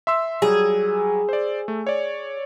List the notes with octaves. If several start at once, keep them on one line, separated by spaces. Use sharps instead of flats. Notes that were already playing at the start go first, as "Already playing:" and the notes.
E5 C6 E6
F#3 G3 G#4
C5 D5
A3
C#5 D5